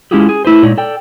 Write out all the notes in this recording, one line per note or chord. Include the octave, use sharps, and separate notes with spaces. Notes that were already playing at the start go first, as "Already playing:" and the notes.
G#3 C#4 E4 F4 G4 G#4
G#4
A3 E4 B4 C5
A#2 G#3 D#4 C#5 D5
A4 D5 G5